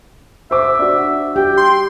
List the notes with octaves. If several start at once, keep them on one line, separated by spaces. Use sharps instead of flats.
C5 E5 D6
D4 F#4
G4 G5
C6